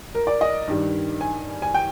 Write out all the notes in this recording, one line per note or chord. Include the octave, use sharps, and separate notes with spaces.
A#4
D5
D#5
G2 D#3 G3
G#5
G#5
G5